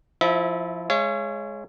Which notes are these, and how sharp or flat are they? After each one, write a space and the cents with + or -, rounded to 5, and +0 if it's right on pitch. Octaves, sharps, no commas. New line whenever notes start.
F3 +0 E4 +0 E5 -30
G#3 +5 C#5 +0 F5 -45